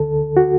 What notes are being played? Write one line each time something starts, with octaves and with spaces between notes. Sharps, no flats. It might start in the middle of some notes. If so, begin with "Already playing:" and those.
Already playing: D2 D3 A4
F#4